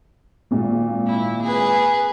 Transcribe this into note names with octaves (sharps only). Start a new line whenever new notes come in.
G#1 A#2
E4
G#4 B4